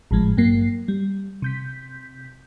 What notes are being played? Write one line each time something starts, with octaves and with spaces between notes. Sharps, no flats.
G#1 A2 F3 G#3
G2 F#3 A#3 C7
G3
C3 G6 B6